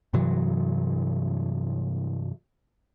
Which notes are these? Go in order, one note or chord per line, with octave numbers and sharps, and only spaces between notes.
G2 C3 E3 F#3